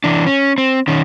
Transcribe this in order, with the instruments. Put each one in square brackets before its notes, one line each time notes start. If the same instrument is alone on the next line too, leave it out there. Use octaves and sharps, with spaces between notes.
[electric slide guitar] E3 D4
C#4
C4
D#3 C#4